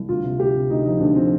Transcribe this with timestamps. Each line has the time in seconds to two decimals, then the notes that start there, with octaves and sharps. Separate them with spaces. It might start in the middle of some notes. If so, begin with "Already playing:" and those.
Already playing: C2
0.09 D2 F4
0.24 C3
0.39 D2 G4
0.55 C3
0.70 D2 D#4
0.85 F3 D#4
1.00 D2 D4
1.15 F3 C4